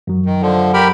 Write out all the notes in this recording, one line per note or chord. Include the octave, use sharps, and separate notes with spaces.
F#2 F#3
D#3
D3 F3
G4 A#4 B5